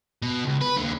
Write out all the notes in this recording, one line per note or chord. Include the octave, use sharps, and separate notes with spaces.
B2
C#2
B4
D#2 D3